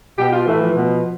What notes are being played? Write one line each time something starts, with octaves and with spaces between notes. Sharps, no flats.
B2 G4
F4
A2 E3 A3
F3
B2